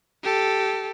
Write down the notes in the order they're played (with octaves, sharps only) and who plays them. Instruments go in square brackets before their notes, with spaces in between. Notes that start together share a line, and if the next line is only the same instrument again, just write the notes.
[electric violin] G4 A4